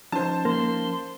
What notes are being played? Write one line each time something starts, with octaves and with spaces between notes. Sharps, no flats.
F3 C#4 D#4 C5 A5
A#3 C6